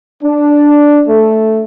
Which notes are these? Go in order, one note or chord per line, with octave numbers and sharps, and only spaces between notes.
D4
A3